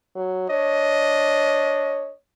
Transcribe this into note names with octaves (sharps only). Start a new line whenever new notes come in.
F#3
D4 C#5 D#5